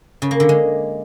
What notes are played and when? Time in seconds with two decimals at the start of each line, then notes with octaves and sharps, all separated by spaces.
0.22 C#3
0.31 A#3
0.40 D3
0.49 G#3